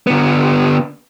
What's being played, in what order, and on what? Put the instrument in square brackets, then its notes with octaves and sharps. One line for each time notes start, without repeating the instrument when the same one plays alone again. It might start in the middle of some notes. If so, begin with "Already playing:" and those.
[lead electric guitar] D3 B3